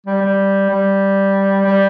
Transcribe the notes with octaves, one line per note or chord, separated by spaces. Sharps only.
G3
G3
G3
G3